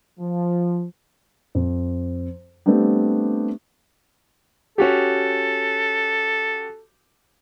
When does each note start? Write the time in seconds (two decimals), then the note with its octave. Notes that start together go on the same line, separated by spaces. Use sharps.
0.19 F3
1.55 F2
2.66 G3 A3 B3 C4 D4 G4
4.78 C#4 F#4 G4 A4